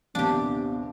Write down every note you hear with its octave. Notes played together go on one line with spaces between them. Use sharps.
A#1 D#2 C3 B3 D4 G4